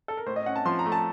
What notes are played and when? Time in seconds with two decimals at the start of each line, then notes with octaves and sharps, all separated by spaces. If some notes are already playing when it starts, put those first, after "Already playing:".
0.08 A4
0.17 A#4
0.26 A2 C5
0.36 D#5
0.46 C#4 F#5
0.56 A5
0.65 F3 C6
0.79 A#5
0.86 A3
0.92 A5